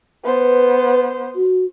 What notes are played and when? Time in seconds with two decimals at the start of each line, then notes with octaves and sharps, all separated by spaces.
0.25 B3 B4 C5
1.35 F#4